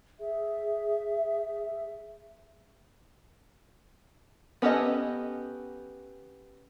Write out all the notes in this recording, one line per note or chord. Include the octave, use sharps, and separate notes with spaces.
G#4 E5
B3 C#4 G4 A4 D#5